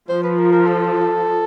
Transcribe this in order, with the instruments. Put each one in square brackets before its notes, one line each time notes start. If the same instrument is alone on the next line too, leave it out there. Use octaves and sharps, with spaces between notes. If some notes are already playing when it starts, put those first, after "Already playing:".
[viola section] F3 [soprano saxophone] C5
[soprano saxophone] B4
A#4
A#4
A4